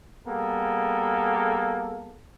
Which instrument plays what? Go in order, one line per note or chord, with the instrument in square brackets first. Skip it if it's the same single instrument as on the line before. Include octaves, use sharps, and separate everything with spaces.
[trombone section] G3 A#3 B3 G#4 A4